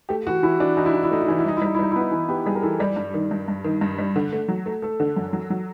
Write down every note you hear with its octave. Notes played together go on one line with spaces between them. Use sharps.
A3 G4
E3 F#4
E3 E4
E3 D4
E3 D#4
E4
E3 D#4
E4
A3 D#4
E4
E3 D#4
E4
G3 D#4
E4
G3 D#4
E4
G3 D#4
E4
B3
D#4
E3
B3 G4
G3 G#4
A#4
E3 A4
G3 D5
G2
D#3
G2
G2
D#3
G2
G3
D3
A3
F#3
A3
A3 A4
D3
F#2
F#3
F#3